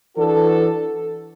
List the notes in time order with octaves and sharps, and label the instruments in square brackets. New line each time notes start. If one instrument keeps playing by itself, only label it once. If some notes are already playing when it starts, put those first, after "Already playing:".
[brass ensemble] E3 D4 F#4 A4